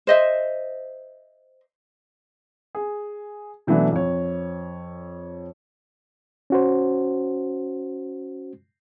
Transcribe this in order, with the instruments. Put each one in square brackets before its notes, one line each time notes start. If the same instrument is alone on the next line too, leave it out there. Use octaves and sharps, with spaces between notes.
[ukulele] C5 D#5 E5
[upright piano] G#4
B2 E3 F#3 A3 D4 E4
F2 C#5
[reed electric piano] C#4 F#4 C5